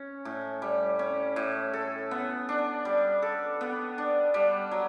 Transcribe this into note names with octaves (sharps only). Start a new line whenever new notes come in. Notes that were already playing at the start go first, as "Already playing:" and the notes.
Already playing: C#4
A2
G3
C#4
A2
A4
B3
D4
G3
A4
B3
D4
G3
F#3